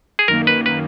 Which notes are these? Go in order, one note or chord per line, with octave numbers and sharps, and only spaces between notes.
G#4
F#2 D#3 A#3 A#4
B4
B4